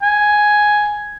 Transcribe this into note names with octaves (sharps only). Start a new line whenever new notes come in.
G#5